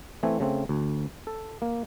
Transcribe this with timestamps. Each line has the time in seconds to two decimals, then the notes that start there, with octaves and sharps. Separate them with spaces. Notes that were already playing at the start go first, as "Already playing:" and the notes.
0.23 E3 A3 C4 G#5
0.40 C#3 A3 C4
0.69 D2
1.27 A4
1.62 A#3